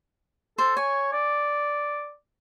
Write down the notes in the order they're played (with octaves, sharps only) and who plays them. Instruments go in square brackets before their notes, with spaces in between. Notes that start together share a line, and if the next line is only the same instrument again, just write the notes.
[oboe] A4 [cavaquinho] C5
[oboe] C#5 [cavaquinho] G#5
[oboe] D5